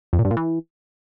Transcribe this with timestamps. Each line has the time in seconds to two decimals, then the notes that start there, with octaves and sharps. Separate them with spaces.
0.13 F2
0.19 A#2
0.25 G2
0.31 A#2
0.37 E3